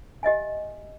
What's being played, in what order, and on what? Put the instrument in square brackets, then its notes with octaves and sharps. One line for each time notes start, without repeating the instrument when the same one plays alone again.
[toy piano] G4 D#5 E5 G#5